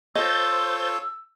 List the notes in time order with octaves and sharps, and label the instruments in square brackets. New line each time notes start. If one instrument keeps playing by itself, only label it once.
[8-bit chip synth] F4 A4 C#5 [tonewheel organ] C5 G6 A6 [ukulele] D#5 [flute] E6